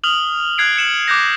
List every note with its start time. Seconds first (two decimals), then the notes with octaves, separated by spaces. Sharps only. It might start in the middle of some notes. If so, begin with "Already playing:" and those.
0.04 D#6 F6 F7 F#7
0.58 F#6 G#6 C7 D7
0.76 G#6 C#7 E7 F#7
1.08 D6 F#6 G6 A#6